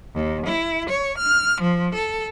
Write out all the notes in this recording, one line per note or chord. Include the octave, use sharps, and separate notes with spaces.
D#2
E4
C#5
F6
F3
A4